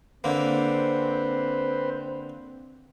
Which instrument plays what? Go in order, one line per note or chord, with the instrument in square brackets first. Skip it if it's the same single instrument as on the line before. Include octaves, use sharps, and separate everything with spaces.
[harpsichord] D3 A#3 [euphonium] C4 [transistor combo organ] B4 C5